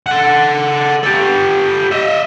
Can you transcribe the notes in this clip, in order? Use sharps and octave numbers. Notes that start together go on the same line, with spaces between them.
A4 F#5
G4 A4
D#5 E5